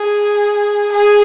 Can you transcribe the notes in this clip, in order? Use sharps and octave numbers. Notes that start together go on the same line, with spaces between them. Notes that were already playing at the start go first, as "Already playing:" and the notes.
Already playing: G#4
G#4